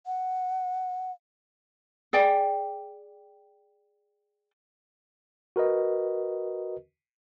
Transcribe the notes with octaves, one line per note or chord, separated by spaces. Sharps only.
F#5
G#4 D5 G5
F#4 A#4 B4 D#5